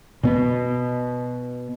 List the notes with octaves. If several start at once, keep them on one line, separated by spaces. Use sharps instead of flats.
B2 B3